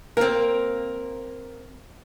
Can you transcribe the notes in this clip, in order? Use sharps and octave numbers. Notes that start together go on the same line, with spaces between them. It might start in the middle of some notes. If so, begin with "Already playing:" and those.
A#3 C4 A#4